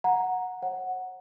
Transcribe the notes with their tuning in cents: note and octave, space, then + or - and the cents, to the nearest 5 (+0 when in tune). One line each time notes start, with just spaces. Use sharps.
F#5 -10 A#5 +0
C#5 -45 F#5 +0